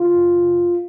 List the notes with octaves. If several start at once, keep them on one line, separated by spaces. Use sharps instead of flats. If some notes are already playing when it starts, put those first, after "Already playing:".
Already playing: C#3 F4
F#2
C#3